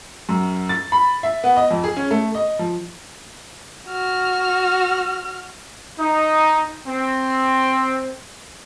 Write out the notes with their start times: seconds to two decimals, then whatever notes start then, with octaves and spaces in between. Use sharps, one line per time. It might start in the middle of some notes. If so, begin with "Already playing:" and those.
0.29 F#2
0.69 A6
0.92 B5
1.23 E5
1.44 B3
1.57 D#5
1.71 F2
1.84 G#4
1.96 C#4
2.11 A3
2.35 D#5
2.59 F3
3.88 F#4 F6
5.98 D#4
6.87 C4